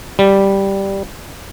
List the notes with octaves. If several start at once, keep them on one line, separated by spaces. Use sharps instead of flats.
G3